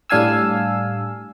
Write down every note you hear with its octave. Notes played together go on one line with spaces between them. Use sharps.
A2 G3 D4 F5 G#5 E6